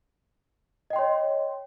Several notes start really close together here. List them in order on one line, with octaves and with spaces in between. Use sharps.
D#5 G5 C6 C#5